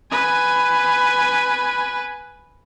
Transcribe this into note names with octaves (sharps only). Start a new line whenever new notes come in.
B4 G#5